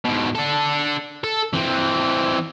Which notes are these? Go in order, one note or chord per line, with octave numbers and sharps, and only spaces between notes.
G#2 B2
D4 A4
A4
E3 C4